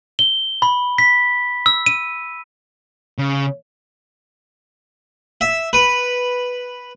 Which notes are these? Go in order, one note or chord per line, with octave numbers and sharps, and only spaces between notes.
G7
B5
B6
E6
D#7
C#3
E5
B4